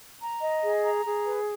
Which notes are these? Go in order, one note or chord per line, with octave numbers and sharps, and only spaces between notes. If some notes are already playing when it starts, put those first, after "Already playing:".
A#5
D#5
G#4
A#5
G#4
B4